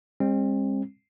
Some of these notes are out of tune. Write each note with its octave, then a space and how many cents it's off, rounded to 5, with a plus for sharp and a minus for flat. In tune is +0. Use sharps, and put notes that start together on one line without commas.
G#3 -40 C4 +35